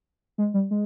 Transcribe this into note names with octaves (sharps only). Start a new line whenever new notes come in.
G#3
G3
G#3